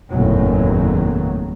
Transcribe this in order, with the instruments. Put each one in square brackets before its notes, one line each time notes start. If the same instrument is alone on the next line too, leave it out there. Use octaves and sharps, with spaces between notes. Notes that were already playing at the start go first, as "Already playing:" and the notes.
[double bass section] F#1 E2 A2 D#3 F#3